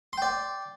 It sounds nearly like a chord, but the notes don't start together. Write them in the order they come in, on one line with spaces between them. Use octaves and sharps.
C6 G5 D5